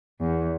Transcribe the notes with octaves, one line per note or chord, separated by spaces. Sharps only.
E2